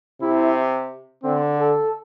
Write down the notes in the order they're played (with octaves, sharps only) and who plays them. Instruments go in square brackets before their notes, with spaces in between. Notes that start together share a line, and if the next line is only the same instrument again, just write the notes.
[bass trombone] C3 [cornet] E4
[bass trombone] D3 [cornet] C4
[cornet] A4